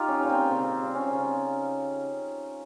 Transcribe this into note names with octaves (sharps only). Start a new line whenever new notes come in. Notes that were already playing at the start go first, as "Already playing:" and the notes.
Already playing: D#4 F4 G4
C#4
A#2
C4
C#3 C4
G3
C#4
C#3